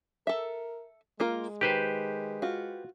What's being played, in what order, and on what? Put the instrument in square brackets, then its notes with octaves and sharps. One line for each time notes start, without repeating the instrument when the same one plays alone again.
[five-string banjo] A4 E5 [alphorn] A#4
[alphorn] G#3 [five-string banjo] A#3 F4 A#4
[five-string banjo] D#3 [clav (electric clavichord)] G4 B4 C5
[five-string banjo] F4 F#4